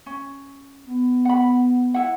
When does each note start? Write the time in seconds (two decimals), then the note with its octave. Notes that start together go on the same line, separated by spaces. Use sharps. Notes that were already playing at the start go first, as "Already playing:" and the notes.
0.06 C#4
0.86 B3
1.25 F#5 B5
1.94 E4 F#5